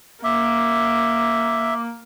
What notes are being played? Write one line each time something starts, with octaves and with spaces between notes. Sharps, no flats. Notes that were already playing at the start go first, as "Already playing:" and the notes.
A#3 E5 D6